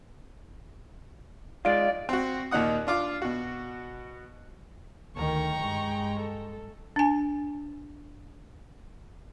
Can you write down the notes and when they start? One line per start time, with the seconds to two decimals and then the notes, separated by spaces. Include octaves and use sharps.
1.65 G#3 D#4 F4 D5 F5 D7
2.09 C4 F#4
2.51 D#2 A#2 D#4 F#5 D#6
2.87 D4 F4 D6
3.22 B2 F#4
5.15 D2 D#3 G5 A#5 C#6
5.60 G2 G#3
6.18 A4
6.96 D4 G#5